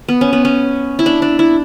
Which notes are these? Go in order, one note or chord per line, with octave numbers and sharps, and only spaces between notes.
B3
C#4
B3
C#4
E4
D4
D4
E4